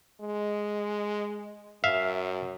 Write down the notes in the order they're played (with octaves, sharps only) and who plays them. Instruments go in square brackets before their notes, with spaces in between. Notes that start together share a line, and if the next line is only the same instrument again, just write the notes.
[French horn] G#3
[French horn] F#2 [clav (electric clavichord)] E5 F5